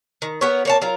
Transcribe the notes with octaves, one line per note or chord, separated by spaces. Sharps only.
D#3
B3 G4 A#4 C#5
A#3 C#5 A5
F#3 F4 A#4